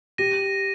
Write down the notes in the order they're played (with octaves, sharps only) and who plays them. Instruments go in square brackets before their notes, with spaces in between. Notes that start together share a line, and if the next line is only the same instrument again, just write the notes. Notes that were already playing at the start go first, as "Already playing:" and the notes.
[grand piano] G4 [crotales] A#6 D#7